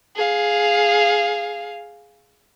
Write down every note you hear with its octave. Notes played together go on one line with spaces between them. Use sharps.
G#4 F5